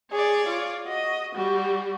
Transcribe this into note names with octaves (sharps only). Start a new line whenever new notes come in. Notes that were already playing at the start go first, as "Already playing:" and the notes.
G#4 C#5 D5
F4
F#4 D#5
G3 F#4